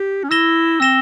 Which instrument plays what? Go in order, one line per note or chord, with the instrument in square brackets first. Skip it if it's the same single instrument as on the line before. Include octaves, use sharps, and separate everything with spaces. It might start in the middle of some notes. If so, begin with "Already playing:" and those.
Already playing: [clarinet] G4
C#4
[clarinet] E4 [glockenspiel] E6 A#6 E7 G7
[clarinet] C4 [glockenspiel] E6 A#6 E7 G7